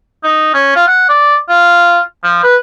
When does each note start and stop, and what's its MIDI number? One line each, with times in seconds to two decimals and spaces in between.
0.24 0.53 63
0.54 0.74 61
0.76 0.85 65
0.87 1.04 78
1.09 1.36 74
1.49 1.98 65
2.23 2.41 53
2.43 2.56 71